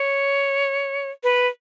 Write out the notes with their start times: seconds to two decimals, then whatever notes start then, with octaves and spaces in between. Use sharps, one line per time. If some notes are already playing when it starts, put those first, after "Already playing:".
Already playing: C#5
1.24 B4